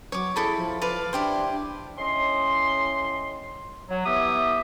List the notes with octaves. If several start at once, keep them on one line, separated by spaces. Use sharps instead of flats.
F#3 C#5 D6
E4 G#4 A4 B5
F3
B4 D5 F5
D4 E4 G4 C5
A2 C#4 D#5 C6
F#3
E3 B3 G4 E5 D#6